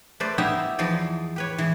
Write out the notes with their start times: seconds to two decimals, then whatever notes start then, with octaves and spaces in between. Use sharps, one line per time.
0.20 A3 B4 C5 D5
0.38 B3 D#4 E4 G4 A#4 E5
0.79 E2 E3 F3 D#4 D5
1.36 G4 B4 C#5
1.58 E3 G#3